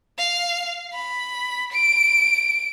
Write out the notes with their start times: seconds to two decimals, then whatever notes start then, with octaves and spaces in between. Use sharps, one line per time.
0.18 F5
0.93 B5
1.72 D7